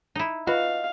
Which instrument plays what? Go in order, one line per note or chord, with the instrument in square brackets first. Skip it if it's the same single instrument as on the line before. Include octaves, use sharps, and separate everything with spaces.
[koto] D#4 E4
[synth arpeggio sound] F4 B4 [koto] F#4 [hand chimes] D#5 [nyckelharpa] F5